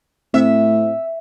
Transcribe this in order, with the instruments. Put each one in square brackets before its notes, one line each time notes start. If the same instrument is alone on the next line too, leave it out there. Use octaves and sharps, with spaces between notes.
[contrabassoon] A2 [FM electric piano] C4 [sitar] E5